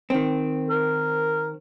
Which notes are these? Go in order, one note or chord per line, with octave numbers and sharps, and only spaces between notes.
D#3 C4
A#4